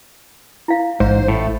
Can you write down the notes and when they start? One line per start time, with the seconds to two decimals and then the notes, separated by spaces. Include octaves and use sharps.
0.68 E4 F5
1.00 A1 G#2 C5
1.28 A2 A3